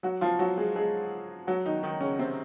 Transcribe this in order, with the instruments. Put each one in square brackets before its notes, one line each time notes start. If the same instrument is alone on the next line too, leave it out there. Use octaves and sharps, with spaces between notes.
[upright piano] F#3 F#4
F3 F4
F#3 F#4
G#3 G#4
G#3 G#4
F#3 F#4
D#3 D#4
D#3 D#4
C#3 C#4
C3 C4